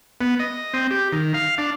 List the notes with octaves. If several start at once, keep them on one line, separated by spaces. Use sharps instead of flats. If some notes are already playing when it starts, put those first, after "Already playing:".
B3
D#5
C4
G4
D#3
F5
D4